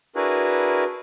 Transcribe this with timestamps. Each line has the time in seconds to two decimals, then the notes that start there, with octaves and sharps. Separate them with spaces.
0.16 D4 E4 F#4 G#4 A#4 B4